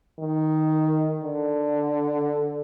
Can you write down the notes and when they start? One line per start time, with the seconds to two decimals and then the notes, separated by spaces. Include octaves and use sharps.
0.19 D#3
1.24 D3